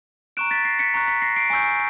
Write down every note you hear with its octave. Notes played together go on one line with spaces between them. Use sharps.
A#5 C#6 F#6 D7 E7
A6 B6
A#6 C7
B6 C#7
A#5 C#6 F#6
B6 C#7
A#6 C7
C7 D7
G#5 C#6 E6 G6 C7 D7